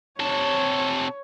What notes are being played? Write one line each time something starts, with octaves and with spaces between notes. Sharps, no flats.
C3 A4 C#5